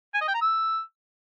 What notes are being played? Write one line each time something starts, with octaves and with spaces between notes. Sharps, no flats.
G#5
D#5
G5
A#5
E6